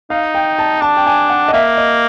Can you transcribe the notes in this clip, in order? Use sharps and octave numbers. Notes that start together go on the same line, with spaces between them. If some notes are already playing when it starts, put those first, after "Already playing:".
D#4 F5
G5
A5
D4 A5
G5
G#5
F#5
D#5
A#3 E5
D#5